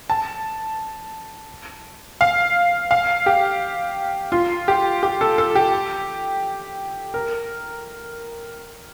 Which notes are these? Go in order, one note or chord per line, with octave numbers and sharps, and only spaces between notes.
A5
F5
F5
G4
F4
G4
G4
A4
A4
G4
A#4